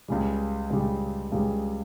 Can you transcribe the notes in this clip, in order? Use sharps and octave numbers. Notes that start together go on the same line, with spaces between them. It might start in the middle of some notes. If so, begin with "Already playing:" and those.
C#2 C#3 G3
C#2 C#3 G3
C#2 C#3 G3